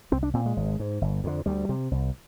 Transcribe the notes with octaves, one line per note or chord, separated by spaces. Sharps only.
C2 C4
D4
A#2 C4
G#3
G#1
G#2
G1
F2 D3
D2 G3
C3
C2